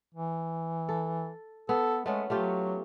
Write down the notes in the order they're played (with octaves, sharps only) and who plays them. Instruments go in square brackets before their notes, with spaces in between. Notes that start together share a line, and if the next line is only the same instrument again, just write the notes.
[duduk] E3
[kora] A4
[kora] B3 [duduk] A4
[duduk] G#3 [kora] A3 B3 C#4
[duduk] F#3 [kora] A3 F4 G4